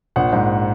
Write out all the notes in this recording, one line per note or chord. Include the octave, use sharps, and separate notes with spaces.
A#1 F#5
G#2